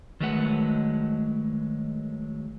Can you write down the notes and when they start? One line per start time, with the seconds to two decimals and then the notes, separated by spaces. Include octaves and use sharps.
0.20 D#3 F#3 G#3 A3 B4 F#5